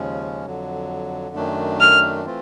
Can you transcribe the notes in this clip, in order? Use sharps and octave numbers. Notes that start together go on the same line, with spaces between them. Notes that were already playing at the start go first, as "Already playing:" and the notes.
Already playing: D#2 C#3 F3 G#3 C#4
F2 D3 F#3
F#2 D#3 F#3 A3 D4
F6
E3 A3 C4 F4